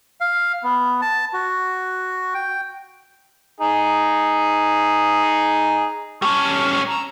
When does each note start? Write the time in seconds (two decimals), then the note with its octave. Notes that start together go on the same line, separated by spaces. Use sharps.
0.21 F5
0.63 B3
1.02 A5
1.33 F#4
2.34 G5
3.60 D#4 G#4
6.22 G3 C#4 A5 C#6 F6
6.87 A#5 E6